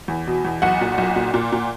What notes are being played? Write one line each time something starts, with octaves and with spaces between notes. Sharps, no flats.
E2
B2
E2
B1 F#5
A#2
B1
A#2
A#2
A#2